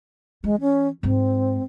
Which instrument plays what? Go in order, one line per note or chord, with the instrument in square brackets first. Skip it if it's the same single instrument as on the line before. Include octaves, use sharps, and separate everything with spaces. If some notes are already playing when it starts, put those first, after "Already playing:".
[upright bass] E3 [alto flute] G#3
[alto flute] C#4
[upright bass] G#2 G#3 [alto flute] C4